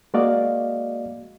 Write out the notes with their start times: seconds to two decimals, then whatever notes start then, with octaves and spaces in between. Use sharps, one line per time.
0.14 G#3 A#3 F#4 D5 D#5 F5